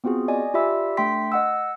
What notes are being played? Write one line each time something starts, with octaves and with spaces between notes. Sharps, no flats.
B3 C4 F4 F#4 G#4
D5 D#5 G#5
F4 G4 D5 E5 B5 E6
A3 D4 G5 C6 B6
D#5 F#5 E6